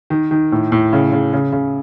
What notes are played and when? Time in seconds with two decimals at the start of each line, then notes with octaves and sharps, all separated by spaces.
0.10 D#3
0.31 D#3
0.52 A2
0.72 A2
0.93 C#3
1.12 C#3
1.33 C#3
1.52 C#3